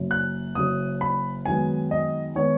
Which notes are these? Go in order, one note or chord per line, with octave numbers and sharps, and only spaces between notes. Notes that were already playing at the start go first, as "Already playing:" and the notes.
Already playing: F#1 F#2 C#3
F#6
F#1 F#2 C#3 D#6
B5
F#2 D#3 G#3 B3 G#5
D#5
D#3 G#3 B3 C#5